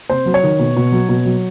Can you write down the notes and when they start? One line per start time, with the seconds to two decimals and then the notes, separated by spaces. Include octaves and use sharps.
0.10 C3 C5
0.26 F#3
0.34 C#5
0.44 D#3
0.60 B2
0.77 B2
0.92 F#3
1.09 B2
1.25 F#3